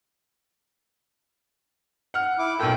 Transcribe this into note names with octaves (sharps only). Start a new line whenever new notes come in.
F#5 F6
E4 D6
B1 A#2 A4 G5